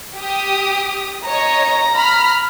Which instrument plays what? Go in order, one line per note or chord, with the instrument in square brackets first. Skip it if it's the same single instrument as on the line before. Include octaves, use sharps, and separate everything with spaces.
[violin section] G4 D#6
[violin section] C#5 D#5 [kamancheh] A#5
[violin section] B5 F6